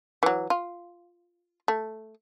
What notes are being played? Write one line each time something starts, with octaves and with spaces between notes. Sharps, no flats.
E3 F#3
F4
A3